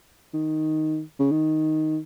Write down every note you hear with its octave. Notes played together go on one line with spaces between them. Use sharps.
D#3
C#3
D#3